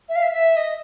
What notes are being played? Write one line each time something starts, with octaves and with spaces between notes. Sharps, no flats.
E5
F5
E5
E5
D#5